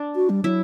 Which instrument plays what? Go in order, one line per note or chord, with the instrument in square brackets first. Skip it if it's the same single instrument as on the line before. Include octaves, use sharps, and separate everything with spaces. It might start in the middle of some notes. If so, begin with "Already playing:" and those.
Already playing: [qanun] D4
[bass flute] F#4
G3
[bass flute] F#3 [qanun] E4